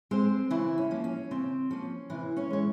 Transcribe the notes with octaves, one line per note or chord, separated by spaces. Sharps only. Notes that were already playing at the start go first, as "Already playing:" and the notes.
G#3 C4 C5
C#3 E3 E4
C#4
F3 A#3
C#4
C#3 C4
F3 A#3 C#4
C3 E3 E4
C#4 C#5
E3 G#3 C#5